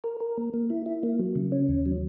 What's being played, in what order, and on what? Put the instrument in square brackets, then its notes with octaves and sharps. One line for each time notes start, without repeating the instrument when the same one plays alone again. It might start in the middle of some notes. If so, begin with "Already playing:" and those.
[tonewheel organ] A#4
A#4
A#3
A#3
E4
E4
A#3
F#3
C#3
C#4
D#2
F#3